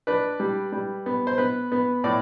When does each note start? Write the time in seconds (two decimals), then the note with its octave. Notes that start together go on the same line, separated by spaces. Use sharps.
0.07 D4 B4
0.40 G3
0.72 G3
1.06 B3
1.27 C5
1.38 B3 B4
1.72 B3
2.04 A2 D5